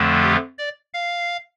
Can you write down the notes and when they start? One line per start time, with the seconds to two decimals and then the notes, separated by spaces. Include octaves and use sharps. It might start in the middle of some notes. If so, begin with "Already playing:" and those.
Already playing: F2 D3 F3 A3
0.22 G4
0.58 D5
0.94 F5